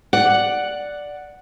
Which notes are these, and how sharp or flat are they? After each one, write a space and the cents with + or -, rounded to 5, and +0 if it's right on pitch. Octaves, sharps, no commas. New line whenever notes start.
D5 +0 F#5 +0